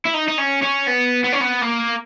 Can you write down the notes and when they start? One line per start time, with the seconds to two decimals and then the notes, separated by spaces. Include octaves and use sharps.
0.06 E4
0.14 D#4
0.28 D#4
0.38 C#4
0.63 C#4
0.88 B3
1.24 B3
1.33 C#4
1.41 B3
1.61 A#3